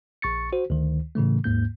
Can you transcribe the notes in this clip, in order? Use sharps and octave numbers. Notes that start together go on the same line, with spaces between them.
A#1 C#6 A6 C#7
F#4 C5
D2 D#3
A2 C#3 E3 A3
D#2 G#2 A#3 G6